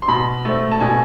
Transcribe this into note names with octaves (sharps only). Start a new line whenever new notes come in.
C6
B2 B5
A3 C4
A5
B2 G#5